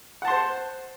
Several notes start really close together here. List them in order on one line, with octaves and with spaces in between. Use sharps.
F#5 A5 C6 C5